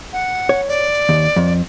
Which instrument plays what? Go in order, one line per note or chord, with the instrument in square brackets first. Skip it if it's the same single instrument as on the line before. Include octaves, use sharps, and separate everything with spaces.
[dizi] F#5
[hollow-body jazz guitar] C#5
[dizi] D5
[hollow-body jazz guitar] D#2
F2